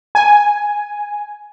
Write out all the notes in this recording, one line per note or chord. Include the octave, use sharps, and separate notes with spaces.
G#5